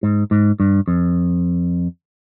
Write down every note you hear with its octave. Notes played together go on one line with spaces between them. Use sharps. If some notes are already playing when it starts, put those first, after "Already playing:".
G#2
G#2
G2
F2